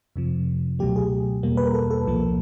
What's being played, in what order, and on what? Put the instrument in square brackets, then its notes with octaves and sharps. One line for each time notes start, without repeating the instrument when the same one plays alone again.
[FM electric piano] F2 C3 F3
C#2 B2 F#3 A3 G4
G#4
E2 B2 G3 A#3
B4
A#4
A4
A4
C2 A#2 F3 A#3